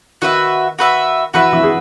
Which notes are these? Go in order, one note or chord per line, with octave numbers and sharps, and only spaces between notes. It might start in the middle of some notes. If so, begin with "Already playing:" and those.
D#3 D#4 F#4 B4 E5
F#4 B4 E5
E3 E4 F#4 B4 E5
E3 E4
G#4